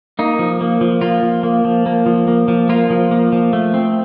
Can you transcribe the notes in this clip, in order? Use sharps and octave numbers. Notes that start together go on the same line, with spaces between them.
A#3 D#4
F3
A#3
F3
A#3 F4
F3
A#3
F3
A#3
F3
A#3
F3
A#3 F4
F3
A#3
F3
A3
C4